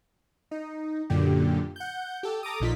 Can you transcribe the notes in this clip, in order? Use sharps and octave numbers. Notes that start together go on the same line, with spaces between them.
D#4
F#2 A#2 D3 G4
F#5 G6
G4 A4
A4 A#5 D6 D#6
A#1 A#2 D#4 F4 B6